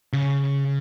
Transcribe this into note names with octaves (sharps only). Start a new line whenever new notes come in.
C#3